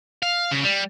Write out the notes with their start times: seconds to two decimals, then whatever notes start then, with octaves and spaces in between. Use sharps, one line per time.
0.23 F5
0.51 C#3
0.63 G3